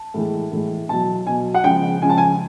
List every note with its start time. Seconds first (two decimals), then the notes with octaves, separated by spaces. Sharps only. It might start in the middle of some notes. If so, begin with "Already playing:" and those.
Already playing: A5
0.14 A2 E3 G#3
0.52 A2 E3 G#3
0.89 B2 F#3 A5
1.26 B2 F#3 G#5
1.54 F#5
1.64 C#3 F3 G#3 G5
2.02 C#3 F3 G#3 G#5
2.10 A5
2.18 G#5